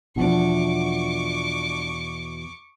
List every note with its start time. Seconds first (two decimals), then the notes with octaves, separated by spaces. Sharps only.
0.16 E2 B2 F3 D4 C#6 D6